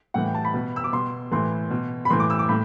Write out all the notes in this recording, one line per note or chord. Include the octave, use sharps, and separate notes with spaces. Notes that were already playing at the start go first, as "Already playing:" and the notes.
A2 E3 F#5
G5
A5
B5
B2
E6
D6
B2 C6
A2 E3 C6
B2
B5
A2 E3 C6
D6
E6
D6
A2 B5